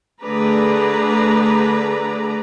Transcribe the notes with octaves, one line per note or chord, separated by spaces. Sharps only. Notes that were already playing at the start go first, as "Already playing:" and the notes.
D3 A3 G#4 B4 D5 A#5